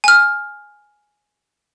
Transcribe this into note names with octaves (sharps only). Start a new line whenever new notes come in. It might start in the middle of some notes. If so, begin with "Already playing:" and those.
G#5 F6